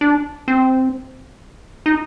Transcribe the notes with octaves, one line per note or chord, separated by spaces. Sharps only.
D4
C4
D#4